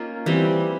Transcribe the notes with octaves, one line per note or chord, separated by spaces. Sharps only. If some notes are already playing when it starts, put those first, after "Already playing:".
Already playing: A#3 C#4 D#4 F4
E3 G3 C4